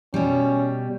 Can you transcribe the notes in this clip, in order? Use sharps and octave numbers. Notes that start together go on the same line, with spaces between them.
B2 G3 C#4